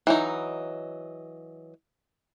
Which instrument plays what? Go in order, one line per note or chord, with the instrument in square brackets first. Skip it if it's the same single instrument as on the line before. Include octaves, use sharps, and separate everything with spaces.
[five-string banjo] E3 F#3 D#4